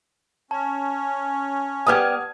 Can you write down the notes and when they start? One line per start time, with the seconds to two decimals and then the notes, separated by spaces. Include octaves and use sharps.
0.51 C#4 A5
1.87 G3 B3 G4 D#6 F6 G#6